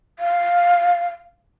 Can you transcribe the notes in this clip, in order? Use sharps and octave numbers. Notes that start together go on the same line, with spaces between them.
F5